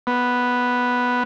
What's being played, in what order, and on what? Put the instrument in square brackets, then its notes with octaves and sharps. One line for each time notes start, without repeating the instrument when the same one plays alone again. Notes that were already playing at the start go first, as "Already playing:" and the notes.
[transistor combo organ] B3